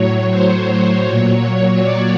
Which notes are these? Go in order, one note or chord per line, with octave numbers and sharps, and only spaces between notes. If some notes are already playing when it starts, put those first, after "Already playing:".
Already playing: A2 F#3 C#5
C5
A#2 F#3 C#5
C#5
D5